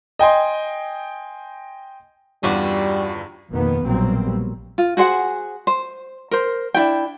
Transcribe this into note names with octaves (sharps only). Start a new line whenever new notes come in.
D#5 G5 G#5 C6
E2 G2 G3 C#4 F4 F#4 D5
F2 B2 D#3 A#3 B3
A#1 B2 F#3 G3 A#3 C4
F4
F#4 G#4 C5 F#5
C5
A#4 C5
D4 E4 F4 G5